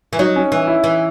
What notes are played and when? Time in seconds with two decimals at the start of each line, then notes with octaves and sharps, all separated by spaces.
0.13 E3
0.19 F#3 D#4
0.36 C#4
0.52 E3
0.67 E4
0.84 E3